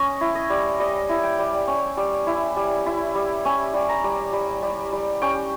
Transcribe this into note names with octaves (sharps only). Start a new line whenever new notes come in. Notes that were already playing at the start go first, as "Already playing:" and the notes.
Already playing: C#4 C#5 D#5
E4
D#5
G3
G3 D#5
E4
G5
G3
C#4
G3
E4
G3
E4
G3
C#4 G#5
G3
A#5
G3
G3
G3
G3
C#4 G5